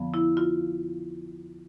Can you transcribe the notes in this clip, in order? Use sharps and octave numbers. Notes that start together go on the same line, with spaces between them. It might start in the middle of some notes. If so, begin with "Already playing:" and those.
Already playing: F2 D3 F3 B3
E4
F4